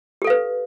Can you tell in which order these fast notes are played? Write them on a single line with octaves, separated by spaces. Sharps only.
G4 A4 F5 B4